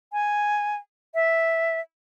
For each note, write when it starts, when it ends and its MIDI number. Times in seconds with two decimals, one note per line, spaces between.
0.13 0.76 80
1.14 1.80 76